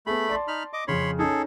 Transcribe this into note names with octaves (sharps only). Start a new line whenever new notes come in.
A3 B3 G#4 B5
D5 A5 C6
D#4 B5 F6
D#5 D6
F2 C#3 C#4 C#5 B5 C6
C#4 D#4 G#4 A4